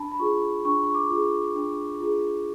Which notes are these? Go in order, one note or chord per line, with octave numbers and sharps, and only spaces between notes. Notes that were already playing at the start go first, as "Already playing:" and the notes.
Already playing: D4 A5 B5
B5
F4 G#4 C#6
D4 C#6
C#6
D6
F4 G#4
D4
F4 G#4